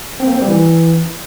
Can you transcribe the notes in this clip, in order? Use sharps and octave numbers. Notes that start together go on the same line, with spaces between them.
C4
A#3
C4
G3
E3